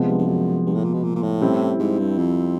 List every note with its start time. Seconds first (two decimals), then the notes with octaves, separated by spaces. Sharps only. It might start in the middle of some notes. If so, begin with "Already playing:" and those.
Already playing: C3 F3 G#3 B3
0.08 G2
0.18 G2
0.27 F#2
0.66 G2
0.75 A2
0.84 A#2
0.94 B2
1.03 A#2
1.15 A#2
1.22 A2
1.41 G3 C4 E4
1.79 G#2
1.99 G2
2.18 F2